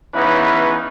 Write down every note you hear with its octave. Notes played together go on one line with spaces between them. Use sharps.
C#3 E3 B3 C#4 D#4 B4